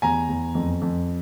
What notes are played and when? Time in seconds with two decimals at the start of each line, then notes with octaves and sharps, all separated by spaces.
0.02 E2 G#5 A#5
0.29 E2
0.55 F2
0.82 F2